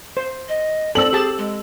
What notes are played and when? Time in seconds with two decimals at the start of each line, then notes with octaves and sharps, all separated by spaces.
0.17 C5
0.49 D#5
0.95 C4 A4 D5 E6 F#7
1.13 G4 G#4 A5
1.38 G#3